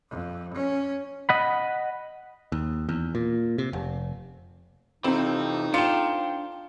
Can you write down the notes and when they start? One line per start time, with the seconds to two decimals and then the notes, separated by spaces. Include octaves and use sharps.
0.10 F2
0.54 C#4
1.29 D#5 F#5 B5
2.52 D#2
2.89 E2
3.15 A#2
3.58 C3
3.73 F1
5.04 F2 C3 E3 C4 D#4
5.74 D4 F4 G5 C#7 E7